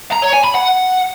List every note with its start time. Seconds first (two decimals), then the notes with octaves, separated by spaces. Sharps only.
0.13 A#5
0.23 C#5
0.34 G#5
0.44 B5
0.55 F#5